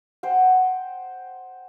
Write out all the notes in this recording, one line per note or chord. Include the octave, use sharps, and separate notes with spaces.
C5 F#5 G5